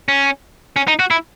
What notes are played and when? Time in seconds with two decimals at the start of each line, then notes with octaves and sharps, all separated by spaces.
0.08 C#4
0.76 C#4
0.88 D#4
0.99 F#4
1.11 E4